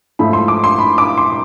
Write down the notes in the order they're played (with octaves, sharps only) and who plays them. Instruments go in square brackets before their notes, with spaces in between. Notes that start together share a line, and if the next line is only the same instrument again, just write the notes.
[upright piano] G#2 F3 A3 E4 B5
C6
D6
C6
B5
D6
C6